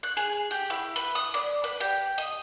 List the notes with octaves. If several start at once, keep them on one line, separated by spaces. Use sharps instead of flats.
F#6
G#4
G4
E4
B4
D#6
D5
B4
G4
D#5